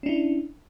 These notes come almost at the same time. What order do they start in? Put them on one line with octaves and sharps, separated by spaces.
C#4 D4 E4